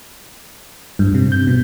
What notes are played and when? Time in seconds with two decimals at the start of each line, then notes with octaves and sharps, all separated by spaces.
0.99 G2
1.14 C3
1.32 G6
1.47 B2